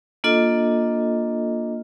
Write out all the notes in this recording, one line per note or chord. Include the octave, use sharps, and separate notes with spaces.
A#3 D4 F4 A4 D#5